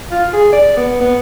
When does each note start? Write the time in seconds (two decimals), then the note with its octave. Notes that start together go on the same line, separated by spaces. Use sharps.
0.11 F4
0.33 G#4
0.52 D5
0.77 B3
1.01 B3